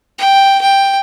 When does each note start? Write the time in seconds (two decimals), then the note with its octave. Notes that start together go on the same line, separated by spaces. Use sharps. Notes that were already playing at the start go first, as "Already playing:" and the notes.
0.18 G5
0.61 G5